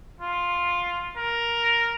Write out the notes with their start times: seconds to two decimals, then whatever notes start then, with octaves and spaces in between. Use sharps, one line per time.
0.21 F4
1.17 A#4